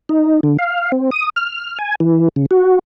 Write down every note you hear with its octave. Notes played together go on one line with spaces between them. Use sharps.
D#4
D3
F5
C4
D#6
F6
G#5
E3
C#3
F#4